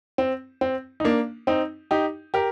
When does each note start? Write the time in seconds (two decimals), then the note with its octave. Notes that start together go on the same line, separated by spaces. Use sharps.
0.18 C4
0.61 C4
1.00 D#4
1.05 A#3 D4
1.47 C4 D#4
1.91 D#4 G4
2.34 G4 A#4